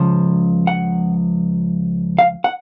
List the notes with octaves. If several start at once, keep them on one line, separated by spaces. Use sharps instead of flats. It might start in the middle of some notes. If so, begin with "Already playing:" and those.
Already playing: C#2 C#3 F3
F#5
F5
F#5